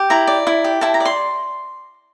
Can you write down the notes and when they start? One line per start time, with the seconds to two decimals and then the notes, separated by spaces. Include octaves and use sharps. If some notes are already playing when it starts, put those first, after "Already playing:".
Already playing: G4
0.10 E4 A#5
0.27 D5
0.47 E4
0.64 G4
0.81 E4 A5
0.94 A#5
1.00 D5
1.05 C6